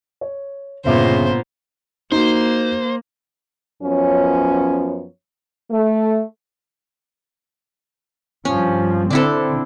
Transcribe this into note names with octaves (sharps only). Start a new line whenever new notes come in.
C#5
G1 A#2 C#3 A#3 B3 C5 E5 D6
A#3 D#4 F#4 C5
F#2 F3 B3 C#4 C#5
A3
G2 F3 C#4
D3 C4 D4 E4 A4